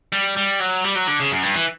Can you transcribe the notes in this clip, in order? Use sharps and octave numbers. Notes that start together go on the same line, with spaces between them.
G3
G3
F#3
G3
F#3
D3
C#3
F#2
G2
E3